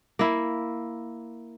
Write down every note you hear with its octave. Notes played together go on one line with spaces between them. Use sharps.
A#3 E4